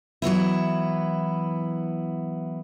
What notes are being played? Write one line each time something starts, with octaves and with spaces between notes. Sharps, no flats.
E3 F#3 B3 E4